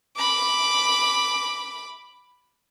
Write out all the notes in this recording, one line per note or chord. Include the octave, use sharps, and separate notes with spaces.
B5 D6